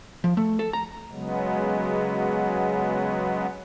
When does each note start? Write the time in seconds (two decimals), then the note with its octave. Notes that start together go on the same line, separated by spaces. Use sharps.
0.24 F3
0.37 A3
0.59 A4
0.73 A#5
1.12 C#3 F#3 G#3 B3